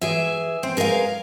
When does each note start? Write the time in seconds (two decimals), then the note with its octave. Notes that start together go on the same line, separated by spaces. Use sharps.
0.01 E3 G#4 E5
0.63 C4
0.77 G#4 A#4 B4 D5 F5